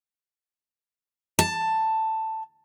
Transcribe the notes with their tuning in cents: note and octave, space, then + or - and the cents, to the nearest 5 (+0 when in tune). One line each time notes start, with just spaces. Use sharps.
A5 +10